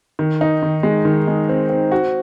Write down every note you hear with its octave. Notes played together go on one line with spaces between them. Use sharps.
D#3
D#4
D#3
G#3
D#3
G#3
C4
C4
F#4